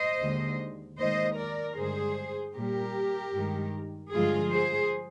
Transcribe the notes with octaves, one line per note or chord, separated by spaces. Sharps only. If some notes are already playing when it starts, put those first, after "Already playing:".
Already playing: C5 D#5
D#2 D3 G#3
D#2 D#3 G#3 C5 D#5
A#4 D5
G2 D3 G#3 G#4 C5
A#2 G3 G4 A#4
G2 D#3 G#3
G2 D3 F3 G#3 F4 G#4
G#4 C5